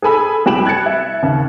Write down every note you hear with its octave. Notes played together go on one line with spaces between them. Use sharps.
G#4 A4 G#5 B5 E6
C2 G4 B5 D7 E7 F#7
F#6 G#6 A6 C#7
E5
D#2 C#3